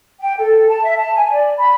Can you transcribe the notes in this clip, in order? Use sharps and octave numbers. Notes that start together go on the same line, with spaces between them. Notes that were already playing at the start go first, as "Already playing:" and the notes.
G5
A4
A5
E5
A5
G#5
D5
B5